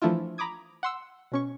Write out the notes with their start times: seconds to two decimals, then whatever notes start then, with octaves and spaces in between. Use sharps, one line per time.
0.02 E3 F3 A3 D4 E4 F4
0.38 A#5 B5 D6 D#6 G#6
0.83 F#5 C6 E6
1.32 B2 C#4 C#6